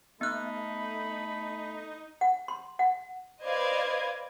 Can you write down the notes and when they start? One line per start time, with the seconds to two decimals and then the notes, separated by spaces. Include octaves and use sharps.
0.21 A3 B3 D#4 B5 F#6
2.21 F#5
2.48 C6
2.79 F#5
3.42 B4 C5 D5 D#5 F5 G#6